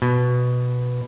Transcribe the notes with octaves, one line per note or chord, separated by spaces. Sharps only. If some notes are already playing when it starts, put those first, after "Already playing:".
B2